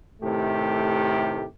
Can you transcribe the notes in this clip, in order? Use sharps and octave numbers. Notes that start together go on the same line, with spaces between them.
A2 C3 D#3 A3 G4